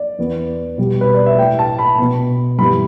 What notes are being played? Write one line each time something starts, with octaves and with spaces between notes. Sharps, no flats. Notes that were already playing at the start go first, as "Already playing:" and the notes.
Already playing: D5
E2 E3 B3
B2 G3 B3
B4
D5
E5
A2 A3 G5
A5
B5
B2 B3
G2 E3 G3 B3 B5